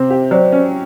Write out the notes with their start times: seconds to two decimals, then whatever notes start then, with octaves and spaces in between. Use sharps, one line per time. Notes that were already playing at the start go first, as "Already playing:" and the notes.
Already playing: C3 C4
0.10 G4
0.31 F#3 C5 D5
0.52 C#4